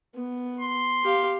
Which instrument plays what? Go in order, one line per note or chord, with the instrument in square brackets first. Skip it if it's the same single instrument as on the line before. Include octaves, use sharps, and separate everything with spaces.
[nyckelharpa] B3
[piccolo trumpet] C6
[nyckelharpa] G4 F5